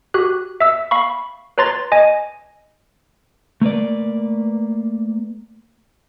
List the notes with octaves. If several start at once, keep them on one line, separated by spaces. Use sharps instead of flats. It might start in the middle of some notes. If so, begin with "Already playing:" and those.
F#4 G4 F#6
E5 E6
F5 B5 C#6
B4 C#5 A#5 C6 A6
D#5 G#5
A3 A#3 B4 D5